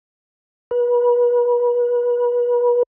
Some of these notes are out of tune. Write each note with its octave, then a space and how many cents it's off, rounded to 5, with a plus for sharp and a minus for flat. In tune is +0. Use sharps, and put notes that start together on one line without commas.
B4 -35